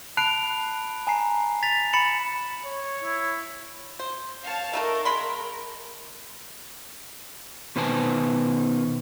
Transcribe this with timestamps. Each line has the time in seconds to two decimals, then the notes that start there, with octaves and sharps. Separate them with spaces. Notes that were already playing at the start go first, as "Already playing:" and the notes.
0.17 A5 B5 F#6 C7 D7 F7
1.07 G#5 A#5 C7
1.63 A6 B6 F7
1.93 B5 A6 C#7 E7 F#7
2.66 C#5
3.04 E4
3.99 C5
4.44 C#5 F5 A5
4.73 A3 D#4 A4 A#4
5.05 G#3 B5 C6
7.76 B2 D#3 B4 C5 G#5 A5